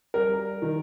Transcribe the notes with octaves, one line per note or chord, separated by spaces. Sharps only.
G3 A#4
D#3